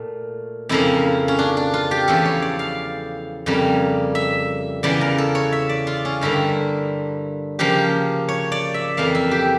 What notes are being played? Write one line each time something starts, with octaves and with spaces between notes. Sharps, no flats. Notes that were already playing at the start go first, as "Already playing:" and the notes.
Already playing: A#2 A3
F2 C#3 F3 A#3 E4
C#4
D4
D4
F4
G4
E2 C#3 F3 A3 A4
C#5
D5
F5
F2 C#3 G3 A#3
E5
E2 C#3 E3 D5
A#4
A4
C#5
E5
D5
F4
C#4
G2 D3 G3 A#3 E4
C#3 F3 A#3 G4
C#5
D5
E5
F2 E3 A#3 F5
E5
G4